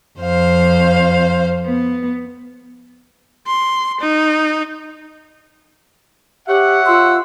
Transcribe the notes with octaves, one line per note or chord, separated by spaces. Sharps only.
F2 C5 F5
B3
C6
D#4
G4 C#5 E5 F#5
F4 C6 E6